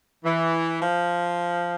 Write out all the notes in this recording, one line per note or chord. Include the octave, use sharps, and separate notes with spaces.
E3
F3